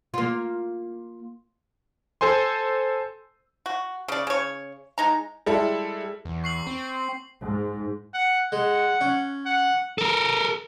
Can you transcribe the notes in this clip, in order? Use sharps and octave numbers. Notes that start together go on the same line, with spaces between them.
A#3 F4
A4 C5 G#5 C6
F#4
C#3 D5
C#3 C#5
G#3 D#4 A#5
G3 G#3 E4 A4
E2
C#6 C7 F#7
C4
G#2
F#5
G#3 F#5
C#4
F#5
A4 A#4